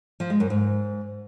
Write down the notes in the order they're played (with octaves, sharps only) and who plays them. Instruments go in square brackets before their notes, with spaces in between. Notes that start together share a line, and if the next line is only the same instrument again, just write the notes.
[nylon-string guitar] F3
G#3
F#2
G#2